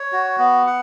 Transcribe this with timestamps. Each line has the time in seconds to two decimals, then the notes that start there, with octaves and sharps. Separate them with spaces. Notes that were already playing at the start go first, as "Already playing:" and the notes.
Already playing: C#5
0.12 F#4
0.39 B3
0.67 F#5